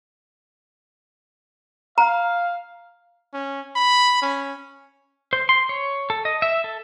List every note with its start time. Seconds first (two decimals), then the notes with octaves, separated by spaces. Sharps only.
1.98 F5 A#5
3.34 C#4
3.76 B5
4.22 C#4
5.33 C5
5.49 C6
5.69 C#5
6.10 A4
6.25 D#5
6.42 E5
6.64 A4